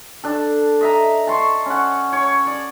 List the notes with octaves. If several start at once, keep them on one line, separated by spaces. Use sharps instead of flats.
D4 A4
D#5 E5 A#5
A5 C6 C#6
C#4 F#5
C#5
D5